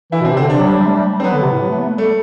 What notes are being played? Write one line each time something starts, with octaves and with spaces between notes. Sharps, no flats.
E3 E4
B2
C4
C3
D3 C4
C3 D4
F#3
G3
G3
A3
G3
C4
F#3 B3
D3
C3
A2
F#3
A3
B3
A3
G3 A3